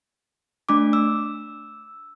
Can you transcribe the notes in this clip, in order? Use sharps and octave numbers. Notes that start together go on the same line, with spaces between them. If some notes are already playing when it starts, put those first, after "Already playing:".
A3 D4 D6
E6